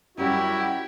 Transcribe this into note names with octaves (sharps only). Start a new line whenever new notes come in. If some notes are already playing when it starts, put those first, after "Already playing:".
F#2 G3 E4 F#4 G4